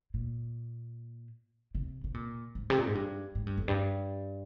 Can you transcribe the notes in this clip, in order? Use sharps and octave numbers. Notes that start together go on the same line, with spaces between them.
A#2
C3
C3
A#2
G#2
C3
A#2
G#2
G2
G#2
G2
F2
G2